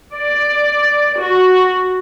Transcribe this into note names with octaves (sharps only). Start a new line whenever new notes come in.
D5
F#4